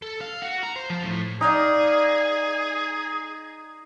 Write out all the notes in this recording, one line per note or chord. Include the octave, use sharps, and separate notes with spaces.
A4
F5
F#4
A#5
C5
F3
A2
D#4 G#4 D5 F5 G5